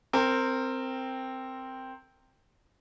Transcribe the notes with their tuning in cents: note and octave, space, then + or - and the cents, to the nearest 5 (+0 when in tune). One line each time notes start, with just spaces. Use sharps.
C4 +0 A#4 -20